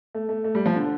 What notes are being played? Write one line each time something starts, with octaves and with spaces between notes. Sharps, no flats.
A3
A3
A3
G3
F3
D3